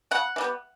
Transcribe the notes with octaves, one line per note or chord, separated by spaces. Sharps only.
C#3 F#5
E3 G3 B3